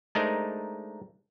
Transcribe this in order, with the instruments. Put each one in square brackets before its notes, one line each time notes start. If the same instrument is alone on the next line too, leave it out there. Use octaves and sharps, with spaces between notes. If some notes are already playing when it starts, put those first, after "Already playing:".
[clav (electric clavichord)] G#3 A3 D4 D#4 A#4 C5